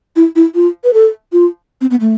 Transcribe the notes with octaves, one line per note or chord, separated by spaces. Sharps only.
E4
E4
F4
B4
A4
F4
C4
B3
A3